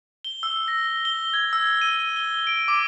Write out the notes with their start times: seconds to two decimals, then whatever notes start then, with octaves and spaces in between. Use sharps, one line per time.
0.24 G7
0.43 E6
0.68 A#6
1.05 G7
1.34 G#6
1.53 E6
1.81 D#7
2.16 G7
2.47 D7
2.68 D6